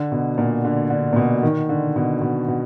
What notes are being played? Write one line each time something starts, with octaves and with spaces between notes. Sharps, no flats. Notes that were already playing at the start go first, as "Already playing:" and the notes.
Already playing: D3
B2
A#2
D3
D3
A#2
B2
D#3
D3
B2
B2
B2